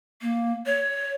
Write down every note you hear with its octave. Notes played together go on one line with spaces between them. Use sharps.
A#3
C#5